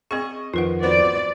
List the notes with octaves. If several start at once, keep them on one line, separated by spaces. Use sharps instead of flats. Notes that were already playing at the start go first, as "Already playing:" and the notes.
C4 G#4 D#5 C#6
F2 D#3 F3 F4 B4 F#5
B3 C4 F#4 D5